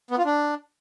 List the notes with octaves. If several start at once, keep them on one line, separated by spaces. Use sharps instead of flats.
B3
F4
D4